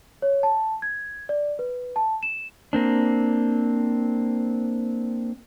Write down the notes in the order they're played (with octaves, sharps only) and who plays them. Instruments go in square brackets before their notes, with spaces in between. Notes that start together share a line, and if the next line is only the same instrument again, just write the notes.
[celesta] C#5
A5
G#6
D5
B4
A5
E7
[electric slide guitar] A#3 C4 D4